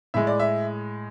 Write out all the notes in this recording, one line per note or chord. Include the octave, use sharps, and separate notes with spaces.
A2 G#3 E5
D5
E5